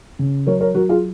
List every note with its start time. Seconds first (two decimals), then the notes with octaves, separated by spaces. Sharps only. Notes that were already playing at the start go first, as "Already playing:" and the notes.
0.19 C#3
0.47 F#3 A#4 C#5
0.61 A#4 C#5
0.75 F#3 F#4 A#4
0.89 F4 G#4